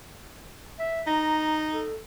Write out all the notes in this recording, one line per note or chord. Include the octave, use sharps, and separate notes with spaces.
E5
D#4 A#5
A4